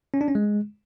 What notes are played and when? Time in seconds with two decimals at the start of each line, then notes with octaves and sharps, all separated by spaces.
0.14 C#4
0.21 D4
0.28 C#4
0.35 G#3